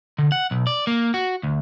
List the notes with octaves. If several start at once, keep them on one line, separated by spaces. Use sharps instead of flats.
D3
F#5
B1
D5
A#3
F#4
D2